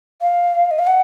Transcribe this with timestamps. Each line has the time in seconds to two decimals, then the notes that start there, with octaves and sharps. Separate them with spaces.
0.21 F5
0.71 D#5
0.79 F5
0.87 F#5